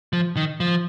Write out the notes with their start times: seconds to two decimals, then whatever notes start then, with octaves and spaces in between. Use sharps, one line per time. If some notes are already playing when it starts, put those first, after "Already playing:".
0.13 F3
0.37 D#3
0.60 F3